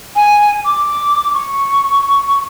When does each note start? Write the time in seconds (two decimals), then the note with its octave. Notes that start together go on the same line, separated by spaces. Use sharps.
0.15 G#5
0.65 D6
1.34 C#6